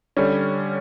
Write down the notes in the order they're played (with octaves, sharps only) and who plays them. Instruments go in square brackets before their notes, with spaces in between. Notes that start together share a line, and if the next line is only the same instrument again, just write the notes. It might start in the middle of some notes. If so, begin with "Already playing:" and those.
[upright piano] D3 G3 C#4